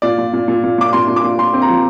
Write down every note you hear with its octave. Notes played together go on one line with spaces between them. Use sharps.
A#2 D5
A#2
A#2
A#2
A#2
A#2 D6
A#2 C6
A#2
D6
A#2
A#2 C6
C4
A#5
F3